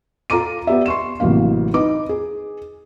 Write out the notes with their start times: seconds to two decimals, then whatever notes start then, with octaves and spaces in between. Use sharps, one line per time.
0.30 F4 A4 A#5 D6 D#7
0.67 B3 G4 D5 E5
0.86 C6 C#6 E7
1.20 A1 C3 F#3 A#3 F5
1.74 D#4 B4 D6
2.09 G#4